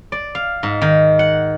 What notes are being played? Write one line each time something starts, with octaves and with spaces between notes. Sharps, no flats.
D5
F5
G#2
D#3
F#5